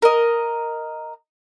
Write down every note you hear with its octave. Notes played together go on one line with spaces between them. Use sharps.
A#4 D#5